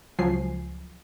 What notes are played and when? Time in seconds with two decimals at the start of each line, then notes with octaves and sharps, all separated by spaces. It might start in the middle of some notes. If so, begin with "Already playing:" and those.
0.19 C#2 F3 F#3 G#5 C7